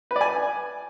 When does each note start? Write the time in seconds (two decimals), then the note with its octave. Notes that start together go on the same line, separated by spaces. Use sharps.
0.11 B4
0.16 D5
0.21 G#5